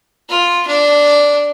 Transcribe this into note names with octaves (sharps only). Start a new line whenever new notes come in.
F4
D4